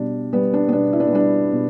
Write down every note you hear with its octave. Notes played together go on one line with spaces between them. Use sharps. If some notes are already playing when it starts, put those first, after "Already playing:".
Already playing: B2 G3 D4
G3 B3
D4
B3
B2 D4
E4
D4
B3
G3 D4
B2